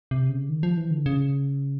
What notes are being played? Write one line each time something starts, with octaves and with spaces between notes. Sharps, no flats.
C3
C#3
D#3
F3
E3
D3
C#3